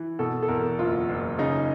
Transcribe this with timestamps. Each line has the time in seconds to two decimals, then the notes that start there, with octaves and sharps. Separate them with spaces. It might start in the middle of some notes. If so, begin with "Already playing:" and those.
Already playing: E3
0.19 B2 A4
0.43 A4
0.48 E2 A#4
0.79 F#1 F4
1.09 F#1
1.38 C#3 D#4